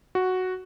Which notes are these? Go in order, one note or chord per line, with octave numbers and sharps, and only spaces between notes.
F#4